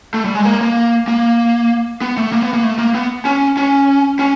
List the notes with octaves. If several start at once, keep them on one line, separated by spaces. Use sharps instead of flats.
A3
G3
G#3
A#3
A#3
A#3
B3
A3
A#3
B3
A#3
A3
A#3
B3
C#4
C#4
C#4